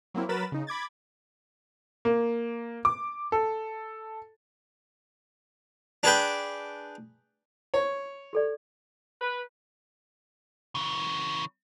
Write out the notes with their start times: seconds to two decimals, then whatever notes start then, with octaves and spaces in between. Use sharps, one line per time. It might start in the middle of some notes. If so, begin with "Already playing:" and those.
0.14 F#3 A#3 C4 E4
0.29 F#3 A#4 B4 B5 A6 E7
0.52 C#3 D#4
0.67 B5 D6 G#6 A6
2.05 A#3
2.85 D6
3.32 A4
6.03 D4 G#4 B4 G5
7.74 C#5
8.33 G4 A4 D5
9.22 B4
10.75 C#3 E3